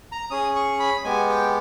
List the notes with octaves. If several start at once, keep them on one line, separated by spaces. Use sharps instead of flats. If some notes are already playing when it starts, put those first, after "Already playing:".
A#5
C#4 G#4 D#6
C#6
B5
G#3 B3 G4 G#5
G5